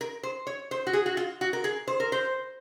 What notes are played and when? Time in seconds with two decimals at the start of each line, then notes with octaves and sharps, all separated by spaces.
0.01 A#4
0.23 C5
0.47 C#5
0.71 C5
0.87 F#4
0.93 G#4
1.06 F#4
1.17 F4
1.41 F#4
1.53 A#4
1.64 G#4
1.88 C5
2.00 A#4
2.12 C5